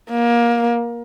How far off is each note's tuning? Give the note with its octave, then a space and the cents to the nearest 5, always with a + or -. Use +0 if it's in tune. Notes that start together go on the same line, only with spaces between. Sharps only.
A#3 +20